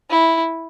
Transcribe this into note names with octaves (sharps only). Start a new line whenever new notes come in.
E4